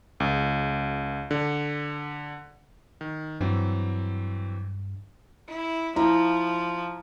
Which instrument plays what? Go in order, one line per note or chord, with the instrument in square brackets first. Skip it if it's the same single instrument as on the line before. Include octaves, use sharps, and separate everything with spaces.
[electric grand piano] C#2
D3
D#3
[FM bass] G2 [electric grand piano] E3 F#3 C4
[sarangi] E4
[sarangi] F3 [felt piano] E4 A#5